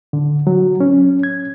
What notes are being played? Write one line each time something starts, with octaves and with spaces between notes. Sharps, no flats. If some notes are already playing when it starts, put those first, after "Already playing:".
D3
F#3
C#4
G#6